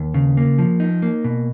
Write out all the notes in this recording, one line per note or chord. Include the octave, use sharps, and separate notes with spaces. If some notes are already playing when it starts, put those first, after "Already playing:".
Already playing: D#2
C#3
A#3
F3
D#4
A#3
B2